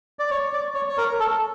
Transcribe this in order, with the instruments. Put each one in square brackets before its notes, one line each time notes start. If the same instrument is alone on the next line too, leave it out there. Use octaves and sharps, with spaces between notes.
[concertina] D5
C#5
D5
C#5
C#5
A#4
A4